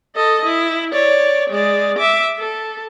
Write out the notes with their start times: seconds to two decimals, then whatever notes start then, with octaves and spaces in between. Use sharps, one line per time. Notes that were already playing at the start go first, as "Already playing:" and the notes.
0.16 A4 D#5
0.45 E4
0.93 C#5 D5
1.50 G#3 D5
1.98 E5 D6
2.39 A4